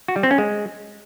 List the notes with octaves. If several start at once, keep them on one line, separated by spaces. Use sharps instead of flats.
F#4
G3
C4
C#4
G#3